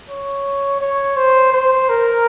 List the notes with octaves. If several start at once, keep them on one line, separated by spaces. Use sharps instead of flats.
C#5
C#5
C5
C5
A#4